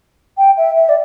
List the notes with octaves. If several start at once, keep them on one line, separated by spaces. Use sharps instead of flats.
G5
E5
E5
D5